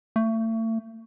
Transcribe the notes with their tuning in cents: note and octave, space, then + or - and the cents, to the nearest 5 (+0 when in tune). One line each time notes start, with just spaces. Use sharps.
A3 +35